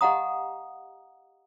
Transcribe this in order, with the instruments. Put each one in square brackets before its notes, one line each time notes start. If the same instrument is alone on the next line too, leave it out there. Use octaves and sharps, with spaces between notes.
[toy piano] G4 D#5 F5 F#5 A#5 D#6